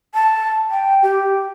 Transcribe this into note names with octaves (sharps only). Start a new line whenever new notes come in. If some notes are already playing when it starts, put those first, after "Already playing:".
A5
G5
G4